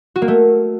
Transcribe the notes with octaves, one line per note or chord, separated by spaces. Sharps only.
F#4
A#3
A3